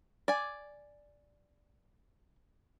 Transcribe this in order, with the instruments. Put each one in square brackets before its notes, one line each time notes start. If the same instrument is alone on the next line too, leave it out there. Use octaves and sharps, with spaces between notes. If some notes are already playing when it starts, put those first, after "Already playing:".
[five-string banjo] D5 G#5